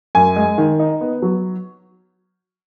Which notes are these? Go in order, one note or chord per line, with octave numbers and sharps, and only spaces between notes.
F#2 G#5
G#3
D#3
D#4
B3
F#3